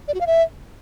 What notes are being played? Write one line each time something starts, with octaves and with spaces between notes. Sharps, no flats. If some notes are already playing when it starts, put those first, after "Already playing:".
D5
F#4
F5
E5